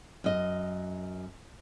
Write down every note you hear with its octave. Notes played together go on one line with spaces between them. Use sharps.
F#2 D#5